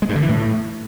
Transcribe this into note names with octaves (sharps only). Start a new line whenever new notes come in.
G#3
G2
D3
E3
A2